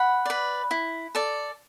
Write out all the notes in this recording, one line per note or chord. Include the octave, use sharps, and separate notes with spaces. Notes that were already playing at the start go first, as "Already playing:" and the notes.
Already playing: F#5 B5
B4 D5
E4
A4 D5